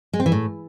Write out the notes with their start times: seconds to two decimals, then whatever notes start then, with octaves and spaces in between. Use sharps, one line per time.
0.13 G#3
0.20 C4
0.26 E3
0.32 A2